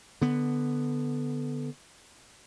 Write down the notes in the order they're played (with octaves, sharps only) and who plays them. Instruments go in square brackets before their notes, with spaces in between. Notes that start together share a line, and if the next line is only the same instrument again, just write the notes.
[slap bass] D3 B3